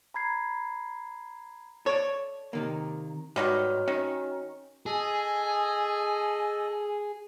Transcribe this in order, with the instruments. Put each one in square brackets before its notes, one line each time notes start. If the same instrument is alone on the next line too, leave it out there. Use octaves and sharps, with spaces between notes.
[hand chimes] A#5 B5 G#6 C7
[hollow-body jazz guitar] A4 D5 [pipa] C#5
[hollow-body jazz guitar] C3 D#3 A#3
[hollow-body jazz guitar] G#2 [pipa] B2 D#3 G3 [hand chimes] F#4 C#5 F6
[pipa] D#3 [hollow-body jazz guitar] C#4
[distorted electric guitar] G#4 [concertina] A4 D#5 [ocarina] G#5